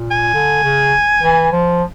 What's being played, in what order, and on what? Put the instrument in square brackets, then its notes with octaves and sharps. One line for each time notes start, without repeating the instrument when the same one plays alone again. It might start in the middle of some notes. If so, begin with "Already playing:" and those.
Already playing: [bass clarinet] A#2
[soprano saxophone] G#5
[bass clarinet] D3
C#3
E3
F3